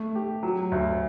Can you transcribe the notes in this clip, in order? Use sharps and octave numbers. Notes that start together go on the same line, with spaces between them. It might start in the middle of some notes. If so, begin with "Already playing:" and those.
Already playing: A3
G4
F#3
D2